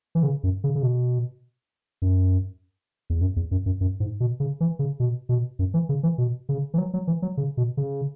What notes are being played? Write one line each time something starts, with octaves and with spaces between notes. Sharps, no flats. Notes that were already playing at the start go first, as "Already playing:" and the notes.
E3
C#3
F#2
C#3
C#3
B2
F#2
E2
F#2
E2
F#2
F#2
F#2
G#2
B2
C#3
E3
C#3
B2
B2
F#2
E3
C#3
E3
B2
C#3
E3
F#3
F#3
E3
F#3
C#3
B2
C#3